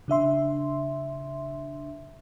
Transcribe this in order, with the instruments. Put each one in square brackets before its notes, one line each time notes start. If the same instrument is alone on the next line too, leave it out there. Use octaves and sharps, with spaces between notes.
[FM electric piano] C#3 D4 E5 C6